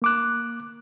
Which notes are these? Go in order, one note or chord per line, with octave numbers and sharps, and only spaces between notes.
A#3 D6 F#6